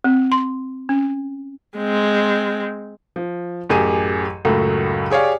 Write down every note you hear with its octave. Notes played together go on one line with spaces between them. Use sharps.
C4
C6
C#4
G#3 C4
F3
A1 F#2 G4 G#4 D#7
C#2 F#2 A2 F#3 A3
G4 G#4 C#5 D5 F5